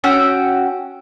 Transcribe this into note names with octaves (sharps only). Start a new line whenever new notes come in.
C#4 F#4 G5 E6